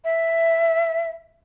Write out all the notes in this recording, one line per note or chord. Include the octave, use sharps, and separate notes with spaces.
E5